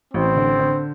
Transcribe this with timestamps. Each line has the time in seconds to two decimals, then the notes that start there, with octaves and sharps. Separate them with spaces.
0.14 A1 C4
0.36 D3
0.59 D3